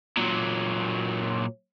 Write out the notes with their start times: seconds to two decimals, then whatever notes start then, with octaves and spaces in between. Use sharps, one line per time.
0.17 A#2 F#3